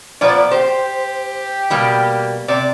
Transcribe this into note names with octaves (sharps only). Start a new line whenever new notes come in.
A#2 F3 B3 D5
G4 C5
B2 G3 A#3
C3 D5